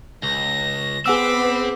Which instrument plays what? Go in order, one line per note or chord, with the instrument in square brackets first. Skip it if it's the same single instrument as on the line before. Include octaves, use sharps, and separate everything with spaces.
[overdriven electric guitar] C#2 [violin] A#6
[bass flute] B3 [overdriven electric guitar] C4 [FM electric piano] G#4 F#5 E6 [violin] D6 B6